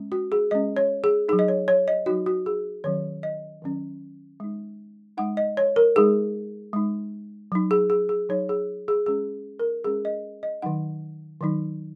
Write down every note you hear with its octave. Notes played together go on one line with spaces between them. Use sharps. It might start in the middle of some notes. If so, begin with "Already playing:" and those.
Already playing: G#3 C#4
F#4
G#4
G#3 C#4 D#5
C#5
G#4
F#3 D#4 G#4
D#5
C#5
C#5
D#5
F#3 D#4 F#4
F#4
G#4
D#3 F#3 C#4 C#5
D#5
D#3 F#3 C#4
G#3 D#4
G#3 D#4 F#5
D#5
C#5
A#4
G#3 D#4 G#4
G#3 D#4
F#3 D#4
G#4
G#4
G#4
F#3 D#4 C#5
G#4
G#4
G#3 C#4 G#4
A#4
G#3 C#4 G#4
D#5
D#5
D#3 F#3 D#4 F#5
D#3 F#3 D#4